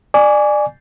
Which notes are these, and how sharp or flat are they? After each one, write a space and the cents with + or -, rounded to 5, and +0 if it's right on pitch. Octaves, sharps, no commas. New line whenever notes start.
D5 +25 G#5 +0 D6 -40